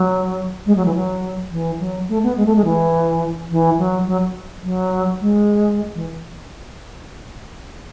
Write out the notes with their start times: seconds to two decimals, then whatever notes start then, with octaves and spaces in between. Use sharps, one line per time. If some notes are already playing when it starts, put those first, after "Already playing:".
Already playing: F#3
0.66 G#3
0.76 F#3
0.86 E3
0.95 F#3
1.52 E3
1.80 F#3
2.09 A3
2.23 B3
2.37 G#3
2.46 A3
2.56 G#3
2.65 E3
3.50 E3
3.79 F#3
4.07 F#3
4.64 F#3
5.21 G#3
5.95 E3